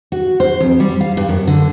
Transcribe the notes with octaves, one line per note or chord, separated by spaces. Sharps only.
F#4
C5
F2
G3
F5
G2
F#2
D3